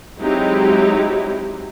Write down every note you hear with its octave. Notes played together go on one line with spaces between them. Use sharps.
F#3 G#3 C4 D#4 E4 G4